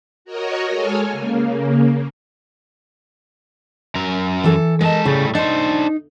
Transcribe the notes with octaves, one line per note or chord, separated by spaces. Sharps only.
F#4 A#4 C#5 D#5
G#3 A4 C#5 G#5 F6
C#3 A#3
F#2 A#4
E3 A4
G#3 A#4 D#5 A5
A2 C#3 G3
D4 D#4 C5